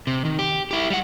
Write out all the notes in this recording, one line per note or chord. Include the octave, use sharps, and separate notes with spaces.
C3
D#3
G4
E4 G4
G3 F#5